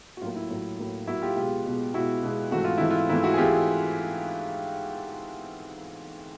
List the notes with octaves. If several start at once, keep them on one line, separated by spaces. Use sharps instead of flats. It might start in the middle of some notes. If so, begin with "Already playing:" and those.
F#4
A2 F#3 A#3 F4
E4
A2 F#3 A#3
A2 F#3 A#3
A2 F#3 A#3 E4 F#4
F4 G4
B2 G#3 B3 F4 G4
B2 G#3 B3
B2 G#3 B3 E4 F#4
B2 G#3 B3
G#2 E3 A3 C4 F#4
F4
G#2 E3 A3 C4 E4
F4
G#2 E3 A3 C4 E4
E4 F#4
G#4
E3 A3 C4 F4 G4